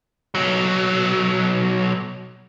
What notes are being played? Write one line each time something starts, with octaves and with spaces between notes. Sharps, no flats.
B1 F#3